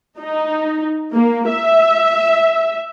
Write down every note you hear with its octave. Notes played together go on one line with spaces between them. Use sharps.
D#4
A#3
E5